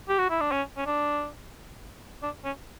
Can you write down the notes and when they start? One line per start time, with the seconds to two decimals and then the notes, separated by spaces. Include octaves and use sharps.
0.09 G4
0.19 F#4
0.30 E4
0.41 D4
0.52 C#4
0.77 C#4
0.86 D4
2.23 D4
2.44 C#4